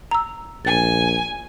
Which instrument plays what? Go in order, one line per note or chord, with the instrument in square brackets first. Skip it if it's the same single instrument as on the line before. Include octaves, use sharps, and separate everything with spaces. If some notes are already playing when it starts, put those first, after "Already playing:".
[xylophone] A#5 E6
[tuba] A#1 [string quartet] G#5 [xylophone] A6